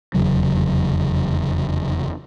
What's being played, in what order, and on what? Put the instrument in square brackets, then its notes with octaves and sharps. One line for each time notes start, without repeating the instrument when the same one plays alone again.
[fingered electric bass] F1 E2 C#3 F#3